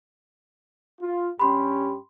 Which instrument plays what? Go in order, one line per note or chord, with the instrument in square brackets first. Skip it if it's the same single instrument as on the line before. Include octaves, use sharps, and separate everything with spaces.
[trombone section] F4
[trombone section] G2 C#4 G4 [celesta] B5 C6